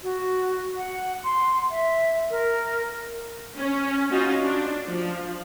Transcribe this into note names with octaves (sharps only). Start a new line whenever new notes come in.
F#4
F#5
C6
E5
A#4
C#4
C#4 D#4 F4 F#4
D4
F3